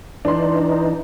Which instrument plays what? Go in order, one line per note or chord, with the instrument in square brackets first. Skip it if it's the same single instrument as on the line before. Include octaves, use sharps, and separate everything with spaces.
[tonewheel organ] E3 D#4 [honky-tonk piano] D4 C6